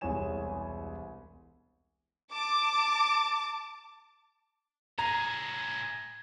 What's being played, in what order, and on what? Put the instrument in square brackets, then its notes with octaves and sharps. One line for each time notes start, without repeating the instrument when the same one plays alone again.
[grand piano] E1 C2 G#3 C#5 G#5 E7
[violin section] A5 D6
[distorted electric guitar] A2 G#4 [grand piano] A#5 [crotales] G#6 A#6